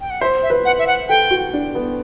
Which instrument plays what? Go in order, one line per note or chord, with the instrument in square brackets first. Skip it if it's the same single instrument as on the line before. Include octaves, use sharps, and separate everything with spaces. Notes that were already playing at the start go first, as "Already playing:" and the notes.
[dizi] G5
F#5
[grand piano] C5 [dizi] E5
[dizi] E5
[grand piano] B4
[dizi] F#5
E5
F#5
[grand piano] A4 [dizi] G5
[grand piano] F#4
D4
B3